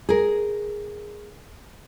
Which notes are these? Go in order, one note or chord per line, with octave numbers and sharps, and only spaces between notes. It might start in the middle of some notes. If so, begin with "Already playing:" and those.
G#4 A#4